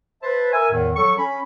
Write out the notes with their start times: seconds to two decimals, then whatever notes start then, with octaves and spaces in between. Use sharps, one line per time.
0.23 B4 C5 E5 A5
0.53 A#4 E5 G#5
0.72 E2 A2 D#3
0.96 F#3 A4 C#6
1.18 C#4 B5